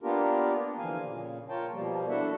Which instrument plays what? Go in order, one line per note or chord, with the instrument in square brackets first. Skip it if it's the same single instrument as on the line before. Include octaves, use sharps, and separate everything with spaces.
[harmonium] A#3 B3 D4 F4 G4 A#4
D3 E3 F3 A#3 F5 G#5
A#2 C#3
F4 A#4 C#5 G5 A5
B2 F3 G3 A#3
D4 E4 F#4 A4 E5 F#5